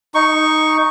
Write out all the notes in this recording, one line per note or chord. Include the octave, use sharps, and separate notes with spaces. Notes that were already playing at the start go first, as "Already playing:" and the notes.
D#4 C#6